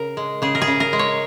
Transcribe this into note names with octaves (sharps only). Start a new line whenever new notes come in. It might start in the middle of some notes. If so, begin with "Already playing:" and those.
Already playing: C#3 A#4
G#3
C#3 G#4
A#4
G#4
C#3
A#4
G#3
C#5